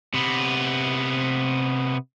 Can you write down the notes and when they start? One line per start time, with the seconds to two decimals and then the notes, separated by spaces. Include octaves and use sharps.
0.14 C3 B3